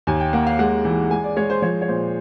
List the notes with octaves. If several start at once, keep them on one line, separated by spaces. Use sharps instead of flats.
D#2 G#5
G5
A#3 F#5
F5
G#3 F#5
E3
G#3 G#5
D5
G#3 C#5
C5
F3 C#5
C#5
A#2 C5